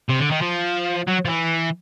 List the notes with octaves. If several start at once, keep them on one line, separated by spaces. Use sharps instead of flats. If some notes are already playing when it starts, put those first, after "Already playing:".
C3
D3
D#3
F3
F#3
F3
E3